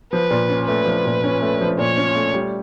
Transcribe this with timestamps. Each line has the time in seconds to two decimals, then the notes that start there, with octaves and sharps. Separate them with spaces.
0.12 F3 B4
0.30 A#2
0.49 C#4
0.67 A3 B4
0.86 F3
1.05 A#2
1.24 C#4
1.42 A3
1.61 F3
1.78 A#2 C#5
1.97 C#4
2.15 A3
2.34 G3